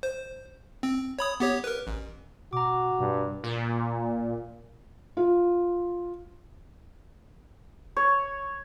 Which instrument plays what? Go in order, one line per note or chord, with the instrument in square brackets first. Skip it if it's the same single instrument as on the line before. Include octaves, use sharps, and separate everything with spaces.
[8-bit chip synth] C5
C4
C#5 B5 D#6
B3 G4 C#5
A#4 B4
A1
[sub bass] B2 [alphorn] F#4 [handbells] A#5 D6
[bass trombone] G2 [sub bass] B2
[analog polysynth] A#2
[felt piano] F4
[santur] C#5